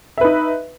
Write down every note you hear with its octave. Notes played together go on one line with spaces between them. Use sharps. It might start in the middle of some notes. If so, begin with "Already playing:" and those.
D#4 B4 E5